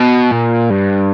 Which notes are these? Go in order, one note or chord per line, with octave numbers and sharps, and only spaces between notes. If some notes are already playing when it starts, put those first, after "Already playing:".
Already playing: B2
A#2
G2